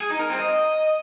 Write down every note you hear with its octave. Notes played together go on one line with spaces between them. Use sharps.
G#4
D#4
A#4
C4
D#5